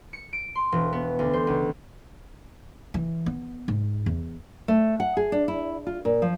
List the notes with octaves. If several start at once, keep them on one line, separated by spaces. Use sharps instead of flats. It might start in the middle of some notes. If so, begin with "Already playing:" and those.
C#7
D7
C6
E1
B3
D2
C5
C#2
E3
B3
G#2
E2
A3
F#5
G#4
D4
E4
F4
A#2
F3